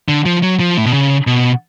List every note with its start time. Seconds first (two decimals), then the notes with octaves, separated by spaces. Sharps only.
0.08 D3
0.26 F3
0.43 F#3
0.60 F3
0.77 A2
0.86 B2
0.93 C#3
1.27 B2